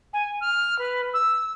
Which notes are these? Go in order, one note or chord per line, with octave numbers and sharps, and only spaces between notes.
G#5
F6
B4
E6